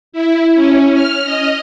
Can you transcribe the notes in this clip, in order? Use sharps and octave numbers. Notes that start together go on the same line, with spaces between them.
E4
C#4
F6
D#5